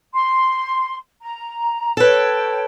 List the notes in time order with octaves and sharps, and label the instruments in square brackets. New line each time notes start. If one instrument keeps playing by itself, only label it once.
[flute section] C6
A#5
[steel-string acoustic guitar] A4 B4 [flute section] C#5 G5